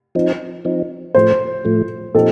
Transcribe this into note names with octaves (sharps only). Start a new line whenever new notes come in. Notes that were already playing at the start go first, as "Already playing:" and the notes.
F3 C4 D#4
F3 C4 D#4
A2 F3 A3 C5
A2 F3 A3
A#2 F3 C4 D#4 G4 A4